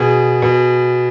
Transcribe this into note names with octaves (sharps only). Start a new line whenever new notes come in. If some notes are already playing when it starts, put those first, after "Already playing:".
Already playing: B2 G#4
B2